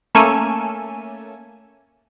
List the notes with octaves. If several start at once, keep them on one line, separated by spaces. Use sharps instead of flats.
A3 A#3 C#4 A4 G#5